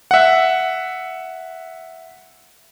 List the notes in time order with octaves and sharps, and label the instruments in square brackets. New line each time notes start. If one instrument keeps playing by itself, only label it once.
[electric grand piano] E5 F#5